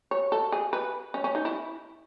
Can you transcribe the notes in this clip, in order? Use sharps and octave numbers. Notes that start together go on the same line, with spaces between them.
C#5
A4
G#4
B4
C#4
C#4
D#4
E4